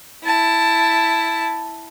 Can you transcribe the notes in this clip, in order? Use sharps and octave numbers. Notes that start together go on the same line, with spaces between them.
E4 A5